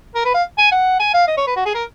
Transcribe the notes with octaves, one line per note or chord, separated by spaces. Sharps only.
A#4
B4
F5
G#5
F#5
G#5
F5
D#5
C#5
B4
F#4
G#4
A#4